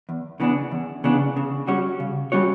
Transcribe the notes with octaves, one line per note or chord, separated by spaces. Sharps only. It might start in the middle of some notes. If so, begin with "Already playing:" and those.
E2
C#3 E3 B3 D4
E2
C#3 E3 B3 D4
C#3
G3 C#4 F#4 C#5
C#3
G3 C#4 F#4 C#5